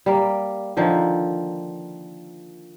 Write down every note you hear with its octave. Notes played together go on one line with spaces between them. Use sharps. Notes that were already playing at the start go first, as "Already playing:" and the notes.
G3 A#3
D3 D#3 F3 A#3